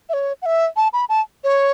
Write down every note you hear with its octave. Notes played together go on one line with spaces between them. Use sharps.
E5
C#5
F#5
E5
A5
B5
A5
C#5